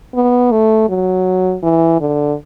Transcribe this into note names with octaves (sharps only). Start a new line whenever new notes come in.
B3
A3
F#3
E3
D3